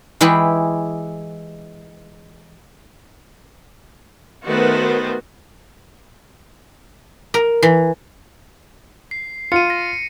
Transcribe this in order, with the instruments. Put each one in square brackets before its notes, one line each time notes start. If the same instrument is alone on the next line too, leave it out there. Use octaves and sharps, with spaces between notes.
[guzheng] E3 G#3 E4 G4 G#4
[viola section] D#3 A3 B3 F#4 B4 C5
[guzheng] A#4
E3
[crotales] C7
[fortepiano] F4 [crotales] C#7 D#7
[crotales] A#6